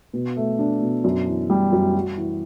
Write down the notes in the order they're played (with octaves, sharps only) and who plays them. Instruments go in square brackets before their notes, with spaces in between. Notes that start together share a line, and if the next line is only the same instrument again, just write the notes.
[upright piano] B2
A3
D4
B2
F#2
E3
G3
F#2
F#4
E3